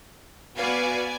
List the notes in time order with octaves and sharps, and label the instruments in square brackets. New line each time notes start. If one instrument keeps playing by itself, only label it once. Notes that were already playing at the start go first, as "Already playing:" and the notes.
[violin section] B3 D5 G#5 [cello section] F#4 B4 F5